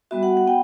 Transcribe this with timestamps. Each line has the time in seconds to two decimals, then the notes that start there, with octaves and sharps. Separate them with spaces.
0.11 G3 B3 F#4 E5
0.23 F#5
0.37 F#5
0.47 B3 G5